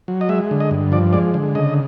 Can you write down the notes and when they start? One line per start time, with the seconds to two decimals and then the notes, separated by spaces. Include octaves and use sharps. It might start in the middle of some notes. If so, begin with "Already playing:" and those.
0.08 F#3
0.21 D#5
0.29 G#3 E5
0.51 D3
0.60 D#5
0.71 G2
0.92 F3 D5
1.13 G#3 D5
1.34 D3
1.55 C#3 D#5